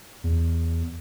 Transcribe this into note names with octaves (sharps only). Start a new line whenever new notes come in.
E2